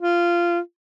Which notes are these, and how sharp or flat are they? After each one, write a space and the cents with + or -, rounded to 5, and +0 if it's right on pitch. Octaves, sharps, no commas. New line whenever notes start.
F4 -15